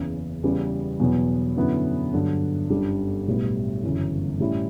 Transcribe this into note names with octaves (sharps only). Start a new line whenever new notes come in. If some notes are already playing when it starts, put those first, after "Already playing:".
Already playing: F#1 E2 C#3
E2 C#3 G3 B3
E2 B2 F#3 B3
F#2 D3 F#3 B3 E4
G2 D3 F#3
G1 F#2 D3 G3 D4
B1 A2 G3 B3
G1 F#2 C#3 E3
A2 G3 C#4 E4